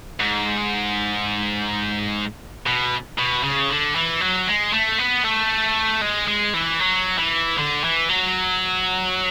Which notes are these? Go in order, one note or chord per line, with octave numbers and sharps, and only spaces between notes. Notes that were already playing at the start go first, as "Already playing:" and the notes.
G#2
B2
B2
C#3
D3
E3
F#3
G#3
A3
B3
A3
G#3
G#3
E3
F#3
E3
D3
E3
F#3